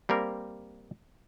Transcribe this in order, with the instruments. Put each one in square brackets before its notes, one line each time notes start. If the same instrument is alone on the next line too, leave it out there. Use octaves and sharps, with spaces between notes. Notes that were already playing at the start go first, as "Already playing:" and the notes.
[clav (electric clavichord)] G3 A#3 C4 A#4